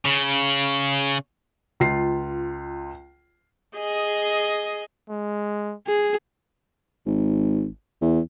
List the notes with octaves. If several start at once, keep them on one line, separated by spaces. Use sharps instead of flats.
C#3
C#2 F4 C7
G#4 D#5
G#3
G#4
G#1
E2